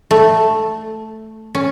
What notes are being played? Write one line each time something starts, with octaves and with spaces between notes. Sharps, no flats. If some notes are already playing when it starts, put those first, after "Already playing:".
A3
C#4